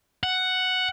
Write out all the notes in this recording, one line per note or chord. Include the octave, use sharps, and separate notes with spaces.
F#5